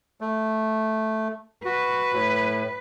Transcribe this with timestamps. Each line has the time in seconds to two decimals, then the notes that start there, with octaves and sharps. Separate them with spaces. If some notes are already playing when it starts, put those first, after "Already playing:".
0.21 A3
1.65 F#4 B4
2.14 A2